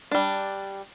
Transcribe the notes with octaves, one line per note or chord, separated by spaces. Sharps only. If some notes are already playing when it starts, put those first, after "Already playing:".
G3 D4